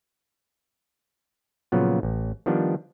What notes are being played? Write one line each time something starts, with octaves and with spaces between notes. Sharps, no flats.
A#2 C#3 F3 F#3 B3
A1
D#3 F3 G3 B3 D4